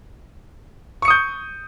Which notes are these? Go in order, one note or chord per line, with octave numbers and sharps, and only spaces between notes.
C#6 D#6 G6 C#7